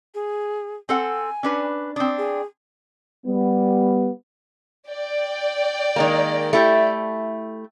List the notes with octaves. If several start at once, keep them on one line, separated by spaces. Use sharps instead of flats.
G#4
C4 A4 F#5 G#5
C#4 D4 B4
C4 D4 D#6
G#4
G3 B3
D5 G5
D#3 G#3 A#3
A3 E4 G4